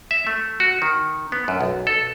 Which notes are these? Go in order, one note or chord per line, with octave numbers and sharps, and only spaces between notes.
E5
A3
F#4
D#3
B3
F#2
B1
A4